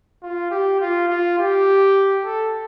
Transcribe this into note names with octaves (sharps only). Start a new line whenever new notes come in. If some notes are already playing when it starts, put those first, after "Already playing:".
F4
G4
F4
F4
G4
A4